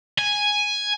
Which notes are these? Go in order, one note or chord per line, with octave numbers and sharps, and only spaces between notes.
G#5